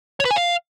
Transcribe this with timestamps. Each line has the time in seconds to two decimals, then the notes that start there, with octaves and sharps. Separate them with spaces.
0.20 C#5
0.25 B4
0.31 G#5
0.36 F5